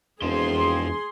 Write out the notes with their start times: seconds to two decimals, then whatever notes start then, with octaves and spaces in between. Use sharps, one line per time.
0.22 E1 F2 G#4 C5 C6